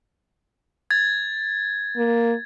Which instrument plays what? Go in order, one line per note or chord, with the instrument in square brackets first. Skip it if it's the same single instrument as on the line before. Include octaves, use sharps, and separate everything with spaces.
[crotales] G#6 A6
[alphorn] A#3